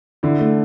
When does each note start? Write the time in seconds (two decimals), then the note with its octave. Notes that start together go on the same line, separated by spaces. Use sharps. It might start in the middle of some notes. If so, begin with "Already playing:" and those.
0.23 D3 E4
0.40 A3